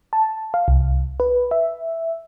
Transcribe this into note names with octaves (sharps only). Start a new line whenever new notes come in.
A5
F5
C2
B4
E5